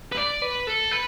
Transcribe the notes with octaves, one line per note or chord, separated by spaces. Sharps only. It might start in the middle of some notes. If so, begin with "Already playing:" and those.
B4
D5
B4
A4
B4